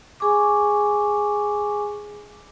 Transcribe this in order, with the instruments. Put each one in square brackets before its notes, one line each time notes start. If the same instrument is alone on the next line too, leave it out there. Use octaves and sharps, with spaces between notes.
[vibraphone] G#4 G#5 C#6 D6